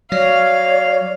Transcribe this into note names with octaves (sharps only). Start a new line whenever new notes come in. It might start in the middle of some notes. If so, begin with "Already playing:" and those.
F#3 C#5 D5 F5